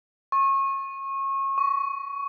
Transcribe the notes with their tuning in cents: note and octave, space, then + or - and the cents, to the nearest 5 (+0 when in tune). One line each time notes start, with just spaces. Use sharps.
C#6 -30
C#6 +20